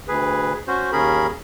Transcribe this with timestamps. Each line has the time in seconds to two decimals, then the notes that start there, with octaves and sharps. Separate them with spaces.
0.08 D2 G#4 B4
0.68 C#4 F#4 C5
0.92 D#2 C#4 G#4 A#4 B5